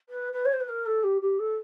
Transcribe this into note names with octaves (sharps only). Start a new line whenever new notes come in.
B4
B4
C#5
C5
B4
A#4
A4
G4
G4
A4